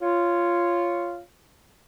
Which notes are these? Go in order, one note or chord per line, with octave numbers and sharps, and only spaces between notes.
F4 C#5